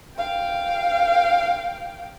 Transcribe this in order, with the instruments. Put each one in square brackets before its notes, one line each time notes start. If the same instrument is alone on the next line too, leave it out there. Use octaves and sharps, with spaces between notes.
[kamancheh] F5 G5